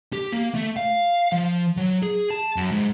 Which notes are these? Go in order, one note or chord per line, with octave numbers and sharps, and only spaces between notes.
G4
A#3
A3
F5
F3
F#3
G#4
A5
F#2
G#2